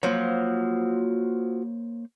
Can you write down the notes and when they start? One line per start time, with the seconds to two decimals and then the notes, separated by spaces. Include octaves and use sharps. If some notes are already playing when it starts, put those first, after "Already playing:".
0.03 F3 F#3 A#3 C5 C#5